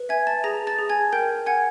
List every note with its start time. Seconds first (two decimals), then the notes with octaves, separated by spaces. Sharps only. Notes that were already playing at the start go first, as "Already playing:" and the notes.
Already playing: B4
0.09 E5 G#5 G#6
0.27 A5 A6
0.44 G#4 A#5 A#6
0.67 A5 A6
0.78 G#4
0.89 G#5 G#6
1.12 A#4 G5 G6
1.46 F#5 G#5 G#6